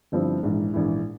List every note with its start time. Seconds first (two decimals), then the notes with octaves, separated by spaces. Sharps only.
0.12 G1 G2 F3 C4 E4
0.43 A#1 G#2 E3
0.74 A#1 G#2 E3